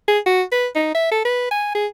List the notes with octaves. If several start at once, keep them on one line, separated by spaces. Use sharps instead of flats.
G#4
F#4
B4
D#4
E5
A4
B4
G#5
G#4